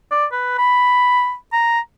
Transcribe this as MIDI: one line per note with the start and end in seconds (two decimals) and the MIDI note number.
0.11 0.26 74
0.32 0.54 71
0.58 1.35 83
1.52 1.80 82